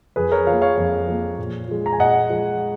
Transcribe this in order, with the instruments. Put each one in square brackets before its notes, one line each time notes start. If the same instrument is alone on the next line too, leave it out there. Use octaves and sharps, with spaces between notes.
[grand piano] F2 G#4 B4
A#4 C#5
F3 A#3 C#5 F5
C#5 F5
F2
F3 A#3
A#2
F3 G#3
A#5
G#5
A#2 D#5 F#5
F3 G#3